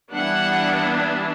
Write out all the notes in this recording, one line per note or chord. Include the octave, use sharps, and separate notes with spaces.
E3 G3 B3 D4 F#5